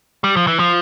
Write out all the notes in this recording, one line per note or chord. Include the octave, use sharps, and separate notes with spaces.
G3
F3
E3
F3